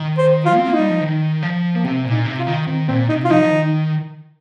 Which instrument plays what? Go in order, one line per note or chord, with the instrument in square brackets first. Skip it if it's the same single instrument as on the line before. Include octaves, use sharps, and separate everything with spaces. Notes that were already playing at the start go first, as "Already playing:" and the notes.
Already playing: [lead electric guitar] D#3
[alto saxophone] C5
F4
[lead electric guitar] C4
[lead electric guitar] A#3 [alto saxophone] F4
[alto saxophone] D#4
[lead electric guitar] G3
F3
D#3
F3
[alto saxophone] A#3
[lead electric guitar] C3 [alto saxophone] C4
[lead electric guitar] A#2
[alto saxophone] D#4
[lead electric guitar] C3
[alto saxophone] F4
[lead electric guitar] D#3
[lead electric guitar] D#3 [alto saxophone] C4
[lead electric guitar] A#2 [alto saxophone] C4
[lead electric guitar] C3 [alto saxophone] D#4
[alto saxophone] F4
[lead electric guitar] F3 [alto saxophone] D#4
[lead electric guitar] F3
D#3